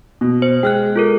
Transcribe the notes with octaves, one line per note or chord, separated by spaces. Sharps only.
B2
C5
G#3 G5 F6 F#6
F4 A4 A#4